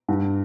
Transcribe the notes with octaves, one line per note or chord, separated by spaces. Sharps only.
G2